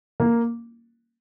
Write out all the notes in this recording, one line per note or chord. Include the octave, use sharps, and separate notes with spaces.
A#3